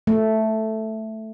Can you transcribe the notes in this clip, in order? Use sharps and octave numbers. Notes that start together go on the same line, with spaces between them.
A3